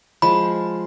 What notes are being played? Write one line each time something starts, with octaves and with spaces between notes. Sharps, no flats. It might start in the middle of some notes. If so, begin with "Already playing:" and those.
F3 G#3 B5